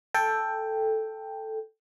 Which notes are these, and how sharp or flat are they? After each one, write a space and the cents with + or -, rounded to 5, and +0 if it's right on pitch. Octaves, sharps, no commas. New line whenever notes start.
A4 +0 G5 +10